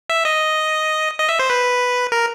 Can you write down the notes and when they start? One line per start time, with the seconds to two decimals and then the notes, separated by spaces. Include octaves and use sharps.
0.10 E5
0.25 D#5
1.19 D#5
1.29 E5
1.39 C5
1.50 B4
2.12 A#4